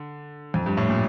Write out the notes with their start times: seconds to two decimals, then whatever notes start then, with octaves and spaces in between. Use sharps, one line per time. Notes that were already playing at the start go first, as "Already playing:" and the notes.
Already playing: D3
0.54 F2
0.66 G2
0.77 A2
0.89 A#2